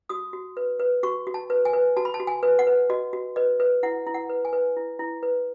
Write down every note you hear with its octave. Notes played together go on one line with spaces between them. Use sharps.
F#4 D#6
F#4
B4
B4
F#4 C#6
F#4
A5
B4
G#5
B4
F#4 A5
B5
A5
F#4
G#5
B4
F#5
B4
F#4 D#5
F#4
B4 D#5
B4
E4 F#5
E4
F#5
B4
G#5
B4
E4
E4
B4